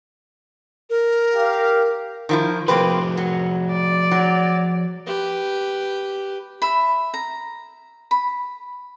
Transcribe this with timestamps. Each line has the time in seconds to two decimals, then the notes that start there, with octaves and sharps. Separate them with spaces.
0.90 A#4
1.33 G4 F5
2.29 D#3 F3 E4
2.68 F3 A#3 C4 F#4 G#4 B4
3.17 F#3
3.73 D5
4.11 F#3
5.07 G4 B4
6.62 E5 B5
7.14 A#5
8.11 B5